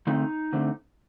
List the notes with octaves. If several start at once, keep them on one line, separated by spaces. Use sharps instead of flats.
D3 A3 C4 D#4
D3 A3 C4